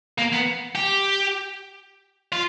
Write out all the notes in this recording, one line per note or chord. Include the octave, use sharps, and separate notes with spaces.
A#3
B3
G4
F4